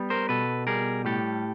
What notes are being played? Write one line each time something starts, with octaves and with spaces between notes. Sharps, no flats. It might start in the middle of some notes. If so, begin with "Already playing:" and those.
Already playing: G3 B3
A#4 C5
B2 A4 B4
G3 G#4 A#4
A2 G4 A4